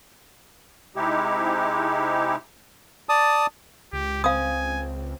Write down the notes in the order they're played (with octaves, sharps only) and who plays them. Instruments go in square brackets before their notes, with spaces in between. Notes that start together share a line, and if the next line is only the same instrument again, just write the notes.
[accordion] C3 G#3 D#4 E4 G4
[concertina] D5 A5 D#6
[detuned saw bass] C#2 [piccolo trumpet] G4
[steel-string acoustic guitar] C4 [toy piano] F5 D#6 [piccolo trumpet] G#5